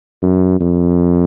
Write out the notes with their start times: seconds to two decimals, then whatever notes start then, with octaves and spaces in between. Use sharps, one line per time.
0.22 F#2
0.61 F2